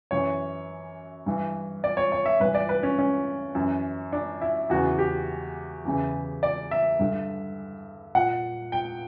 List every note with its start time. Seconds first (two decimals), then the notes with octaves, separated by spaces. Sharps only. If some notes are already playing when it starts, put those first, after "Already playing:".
0.11 F#2 E3 C#5
1.26 G2 E3
1.84 D5
1.97 C#5
2.12 C#5
2.26 E5
2.40 G2 E3 B4
2.55 D5
2.69 B4
2.83 C#4
2.99 C#4
3.55 F#2 E3
4.13 D4
4.41 E4
4.70 E2 C#3 E3 F#4
4.99 G4
5.85 E2 C#3 E3
6.43 D5
6.71 E5
7.00 G2 D3
8.15 A#2 F#5
8.72 G5